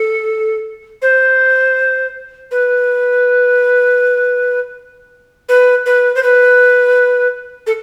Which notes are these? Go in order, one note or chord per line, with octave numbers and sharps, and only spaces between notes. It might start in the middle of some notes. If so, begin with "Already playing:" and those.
Already playing: A4
C5
B4
B4
B4
C5
B4
A4